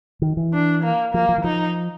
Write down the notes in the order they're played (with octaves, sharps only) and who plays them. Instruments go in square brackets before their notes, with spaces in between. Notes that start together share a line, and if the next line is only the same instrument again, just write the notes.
[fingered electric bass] D#3
E3
[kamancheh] D4
A#3
[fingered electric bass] F3 [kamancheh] A#3
[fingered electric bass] F3
E3
[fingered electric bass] F3 [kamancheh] D#4